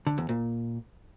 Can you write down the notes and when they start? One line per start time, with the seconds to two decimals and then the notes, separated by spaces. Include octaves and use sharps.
0.07 D3
0.18 E2
0.29 A#2